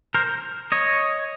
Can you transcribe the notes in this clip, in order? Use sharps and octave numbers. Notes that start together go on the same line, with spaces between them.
A#4 C5
C#5 D#5